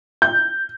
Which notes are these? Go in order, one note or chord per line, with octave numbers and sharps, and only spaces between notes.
G6